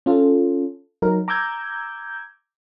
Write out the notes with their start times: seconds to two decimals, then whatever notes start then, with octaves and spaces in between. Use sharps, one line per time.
0.06 C#4 F4 A4
1.02 F#3 D#4 A#4
1.28 A#5 D6 E6 G6 G#6